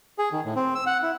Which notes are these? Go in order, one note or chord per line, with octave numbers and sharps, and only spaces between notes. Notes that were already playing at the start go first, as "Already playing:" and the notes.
G#4
D#3
A2
C4
E6
F#5
E4